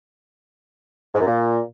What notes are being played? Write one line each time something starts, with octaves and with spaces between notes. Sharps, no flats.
G#2
F#2
A#2